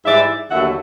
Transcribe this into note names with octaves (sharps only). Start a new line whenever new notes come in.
G#2 E3 G3 D5 E5
D#2 D3 F#3 A3 E5 F#5